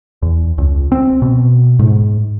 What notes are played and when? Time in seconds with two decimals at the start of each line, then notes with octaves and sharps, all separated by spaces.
0.22 E2
0.58 C#2
0.92 C4
1.22 B2
1.79 G#2